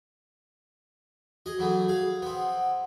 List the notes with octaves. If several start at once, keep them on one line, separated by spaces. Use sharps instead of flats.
F#4 G#4 D#5
E3 F#3 A3
G#4 F5
B3 C4 F#5